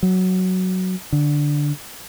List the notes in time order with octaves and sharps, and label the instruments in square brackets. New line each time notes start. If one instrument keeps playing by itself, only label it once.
[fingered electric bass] F#3
D3